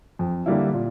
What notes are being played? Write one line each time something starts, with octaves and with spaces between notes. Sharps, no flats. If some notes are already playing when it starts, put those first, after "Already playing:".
F2
D3 G3 A#3 E4
A#2